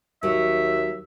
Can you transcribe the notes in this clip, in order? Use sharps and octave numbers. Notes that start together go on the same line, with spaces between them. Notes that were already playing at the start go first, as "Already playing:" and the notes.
D#2 F#3 E5